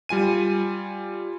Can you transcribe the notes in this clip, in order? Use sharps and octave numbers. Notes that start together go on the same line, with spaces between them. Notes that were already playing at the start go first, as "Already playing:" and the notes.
G3 F4 G#5 D#7